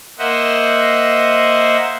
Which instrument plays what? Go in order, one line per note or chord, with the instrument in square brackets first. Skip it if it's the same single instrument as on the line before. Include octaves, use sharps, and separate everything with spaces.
[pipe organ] A#3 C5 D#5 E5 F#5